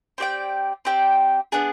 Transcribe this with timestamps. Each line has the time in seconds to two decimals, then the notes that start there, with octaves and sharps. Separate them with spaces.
0.18 C4 G4 D5 G5
0.85 C4 G4 D5 G5
1.52 B3 D4 G#4